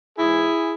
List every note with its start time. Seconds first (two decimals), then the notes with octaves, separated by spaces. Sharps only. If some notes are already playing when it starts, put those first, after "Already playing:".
0.18 G#2 E3 G#3 E4 G#4